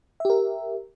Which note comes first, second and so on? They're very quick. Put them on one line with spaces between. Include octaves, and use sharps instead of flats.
E5 G4 A#4